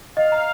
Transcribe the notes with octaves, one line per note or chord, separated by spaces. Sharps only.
D#5 F5
A#5